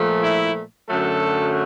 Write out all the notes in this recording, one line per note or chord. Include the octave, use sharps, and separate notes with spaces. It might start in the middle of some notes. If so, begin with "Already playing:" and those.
Already playing: A#2 F3 A3
E4
F#2 D3 F#3 A3 A4